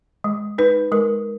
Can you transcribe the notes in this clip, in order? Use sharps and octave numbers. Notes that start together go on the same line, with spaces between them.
G#3
D#4 B4
G#3 A#4